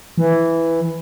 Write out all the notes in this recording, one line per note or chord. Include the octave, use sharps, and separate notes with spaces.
E3